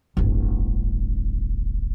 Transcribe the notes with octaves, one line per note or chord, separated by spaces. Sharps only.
D1 G1